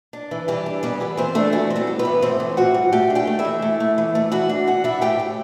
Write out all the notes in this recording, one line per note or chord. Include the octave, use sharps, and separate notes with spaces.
D4
E3
E3 G3 G4
D4
G3 B3 G4
E3 B3 B4
E3 C4 C5
A3 D4 A4
E3 F#4
C4
G3 G4
A2
B3 B4
E3
A2 C4 C5
E3
A2 F#4 F#5
G3
A3 G4 G5
D4
G4 G5
A3
E4 E5
E3
A3
A3
E3
A3
E3 F#4 F#5
D4
E3 F#4 F#5
D4 E4 E5
A2 G4 G5
A2